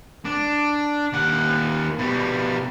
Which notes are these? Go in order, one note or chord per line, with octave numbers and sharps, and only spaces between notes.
D4
D#2 F#5
B2 G3